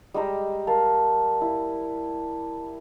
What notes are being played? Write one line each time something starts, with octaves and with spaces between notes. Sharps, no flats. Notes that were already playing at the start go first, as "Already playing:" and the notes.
G3 G#3 G4 A#5
A#4 F5 A5
E4